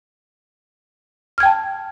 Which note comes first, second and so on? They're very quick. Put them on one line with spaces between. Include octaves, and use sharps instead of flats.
F6 G#6 G5 A5